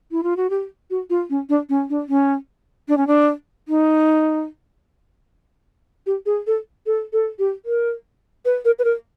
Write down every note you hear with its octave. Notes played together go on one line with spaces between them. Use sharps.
E4
F4
F#4
G4
F#4
F4
C#4
D4
C#4
D4
C#4
D4
C#4
D4
D#4
G4
G#4
A4
A4
A4
G4
A#4
B4
A#4
B4
A#4